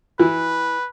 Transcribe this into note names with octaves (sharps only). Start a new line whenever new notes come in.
E3 B4